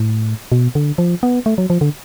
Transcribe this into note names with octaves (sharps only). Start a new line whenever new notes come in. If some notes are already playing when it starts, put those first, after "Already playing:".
Already playing: A2
B2
D3
F3
B3
A3
F#3
F3
D3